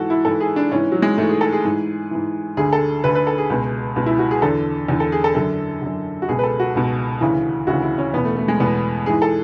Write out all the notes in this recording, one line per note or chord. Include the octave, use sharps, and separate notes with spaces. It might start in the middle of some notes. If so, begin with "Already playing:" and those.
Already playing: G#2 E3 F#4 A4
E4
G#2 E3 A4
G#4
D4
G#2 E3 C#4
F#3
G#3
G#2 E3 A3
G#4
A4
G#4
G#2 E3
G#2 E3
D2 D3 G#4
A4
D2 D3 B4
B4
A4
G#4
C#2 B2
C#2 B2
E4
F#4
G#4
E2 D3 A4
E2 D3
A4
G#4
A4
F#2 D3 A4
F#2 D3
F#4
C#2 B2 G#4
B4
A4
F#4
C#2 B2
D2 C#3 E3
D2 C#3 E3 F#4
E4
C#4
E2 B2 B3
A3
A3
G#3
E2 B2 B3
G#2 E3 G#4
A4